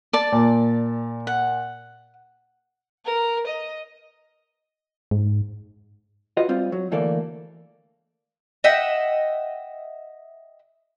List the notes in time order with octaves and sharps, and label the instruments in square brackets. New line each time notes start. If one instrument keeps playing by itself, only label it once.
[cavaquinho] D5 A5
[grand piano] A#2
[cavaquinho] F#5
[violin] A#4
D#5
[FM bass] G#2
[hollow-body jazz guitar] F4 F#4 B4 D#5
G3 C4 F4
F#3
D2 E3 A3 A#3 A4 D5
[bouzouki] D#5 E5 F#5 G5